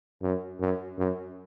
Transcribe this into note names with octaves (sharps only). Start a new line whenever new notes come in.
F#2
F#2
F#2